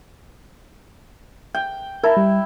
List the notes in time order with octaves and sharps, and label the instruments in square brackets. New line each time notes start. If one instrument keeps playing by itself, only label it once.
[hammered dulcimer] G5
[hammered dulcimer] E4 [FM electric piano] A#4 A5 A#5
[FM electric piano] G3